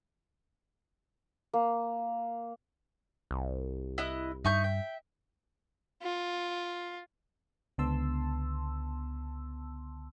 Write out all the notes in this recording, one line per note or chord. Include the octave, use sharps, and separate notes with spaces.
A#3
C2
E4 D#5 F#6
G2 D#4 E5 C#6 G6
G5
F4
C#2 D3 B3 A5 C6 E6